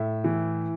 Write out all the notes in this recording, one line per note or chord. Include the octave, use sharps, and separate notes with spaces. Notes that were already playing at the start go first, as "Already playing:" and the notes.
Already playing: A2 E5
E3